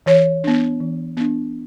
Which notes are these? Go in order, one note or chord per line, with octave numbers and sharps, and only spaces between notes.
E3 C#5
B3 D4
E3
B3 D4